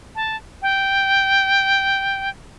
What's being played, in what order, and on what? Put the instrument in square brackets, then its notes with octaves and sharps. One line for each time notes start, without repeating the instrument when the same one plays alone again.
[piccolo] A5
G5